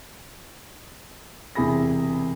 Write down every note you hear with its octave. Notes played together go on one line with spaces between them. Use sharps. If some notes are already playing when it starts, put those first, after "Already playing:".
E1 C3 E4 G#4 B5 A#6